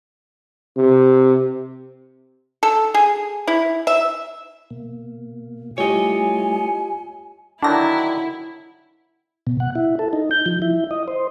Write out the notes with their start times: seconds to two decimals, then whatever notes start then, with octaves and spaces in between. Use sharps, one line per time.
0.77 C3
2.63 A4
2.94 G#4
3.48 E4
3.87 E5
4.70 B2 A#3
5.78 G3 A3 E4 F4 G4 C#5 D#5 G#5
7.62 D3 D#3 F#3 D4 E4 A#6
9.47 B2
9.60 F#5
9.75 E4
9.99 A4
10.13 D#4
10.31 G6
10.46 F3
10.62 E4
10.91 D#5
11.08 C5